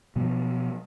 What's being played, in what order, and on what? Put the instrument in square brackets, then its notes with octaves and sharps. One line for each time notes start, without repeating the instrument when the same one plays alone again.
[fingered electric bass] B2 F3 F#3 B3